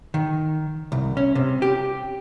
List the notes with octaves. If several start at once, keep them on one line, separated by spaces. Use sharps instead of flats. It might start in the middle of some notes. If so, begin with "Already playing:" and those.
D#3
C2
C#4
C3
G4